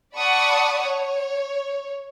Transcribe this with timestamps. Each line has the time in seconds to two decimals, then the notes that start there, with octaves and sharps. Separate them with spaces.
0.18 D5 F#5 A5 B5 C#6 D#6
0.84 C#5